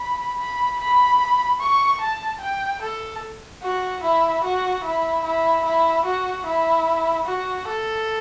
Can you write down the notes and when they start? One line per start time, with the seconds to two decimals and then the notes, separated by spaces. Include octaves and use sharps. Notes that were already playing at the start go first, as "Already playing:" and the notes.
Already playing: B5
0.38 B5
0.80 B5
1.60 C#6
2.01 A5
2.41 G5
2.82 A4
3.63 F#4
4.03 E4
4.44 F#4
4.84 E4
5.24 E4
5.65 E4
6.06 F#4
6.46 E4
7.26 F#4
7.67 A4